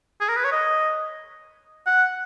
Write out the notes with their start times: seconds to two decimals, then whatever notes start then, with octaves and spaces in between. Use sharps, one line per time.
0.21 G#4
0.29 A#4
0.36 B4
0.44 C#5
0.52 D#5
1.86 F#5